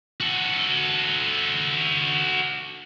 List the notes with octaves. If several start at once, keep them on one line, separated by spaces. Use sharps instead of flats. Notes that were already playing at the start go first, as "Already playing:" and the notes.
F#4 A4